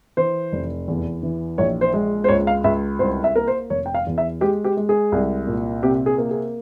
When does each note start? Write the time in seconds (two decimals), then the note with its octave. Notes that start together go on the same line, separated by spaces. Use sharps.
0.17 E3 C5
0.53 F1
0.88 E2
1.23 E3
1.58 A#1 C#5
1.81 C5
1.94 G#3
2.24 C5
2.28 C#2 C#5
2.47 F5
2.64 C#2 E5
2.99 C2 C5
3.24 E5
3.36 A#3 A#4
3.47 C5
3.70 F1 C#5
3.86 G5
3.94 F5
4.07 E2
4.18 E5
4.41 G#3 G4
4.64 G4
4.77 G#3
4.89 G#4
5.12 C2
5.47 A#2
5.83 C3 G4
6.06 G#4
6.18 A#3
6.31 G#4